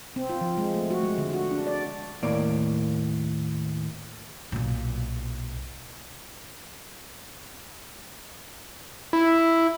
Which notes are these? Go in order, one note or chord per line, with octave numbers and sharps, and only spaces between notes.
C4
F4
F3
G#3
A3
F#4
G#3
D3
F#4
D4
D5
D#2 A2 A#3 D5
B1 A#2
E4